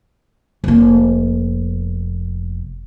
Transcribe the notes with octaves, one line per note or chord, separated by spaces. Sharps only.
F1 A#3